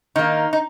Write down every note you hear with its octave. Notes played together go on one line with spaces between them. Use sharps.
D#3 A#3 D#4
D#4